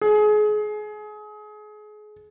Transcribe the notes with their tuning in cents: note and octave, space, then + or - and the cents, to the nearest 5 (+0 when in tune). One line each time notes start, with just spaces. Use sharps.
G#4 +30